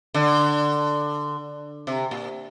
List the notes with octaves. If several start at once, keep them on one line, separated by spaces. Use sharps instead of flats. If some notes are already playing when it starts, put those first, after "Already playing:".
D3
C3
A#2